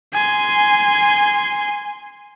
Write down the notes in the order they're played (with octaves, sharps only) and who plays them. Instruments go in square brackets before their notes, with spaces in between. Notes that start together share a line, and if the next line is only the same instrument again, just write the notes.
[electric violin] G#5 C6